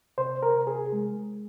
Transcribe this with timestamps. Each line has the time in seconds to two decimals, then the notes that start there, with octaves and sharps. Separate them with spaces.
0.18 C3 C5
0.43 A#4
0.55 C3
0.67 G#4
0.93 G#3